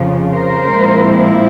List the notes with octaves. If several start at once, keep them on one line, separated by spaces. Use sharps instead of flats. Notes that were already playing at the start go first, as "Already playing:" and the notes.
Already playing: F2 C#3 F3
A#4 C5
A#2 F3 G#3 C4 E4